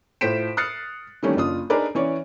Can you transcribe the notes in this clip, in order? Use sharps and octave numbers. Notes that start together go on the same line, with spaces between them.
A2 F4 C5 B6 D7 E7
D#6 F6 F#6 A6 C7 C#7
D#3 E3 G3 A3 A#3 C#4
F#1 D4 F4 D#6
D4 D#4 G#4 A#4 B4 D5
E3 C#4 C#5 D5